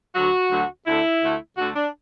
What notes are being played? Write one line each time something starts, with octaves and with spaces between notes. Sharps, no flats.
D2 D3 F#3 F#4
D2 D3 F#3
D2 D3 A3 E4
D2 D3 A3
D2 D3 A3 F#4
D4